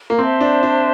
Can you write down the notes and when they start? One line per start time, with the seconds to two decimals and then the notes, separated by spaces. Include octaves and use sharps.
0.10 A#3
0.18 C4 C5 E5 A5 C6
0.41 D4
0.63 D4